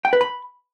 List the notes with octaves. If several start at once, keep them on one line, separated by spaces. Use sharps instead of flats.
G5
B4
B5